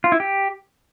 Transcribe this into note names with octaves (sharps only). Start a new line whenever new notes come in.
F4
E4
G4